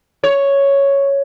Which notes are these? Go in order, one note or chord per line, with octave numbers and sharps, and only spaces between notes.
C#5